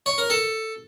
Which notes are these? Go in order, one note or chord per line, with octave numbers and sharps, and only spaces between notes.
C#5
A#4
A4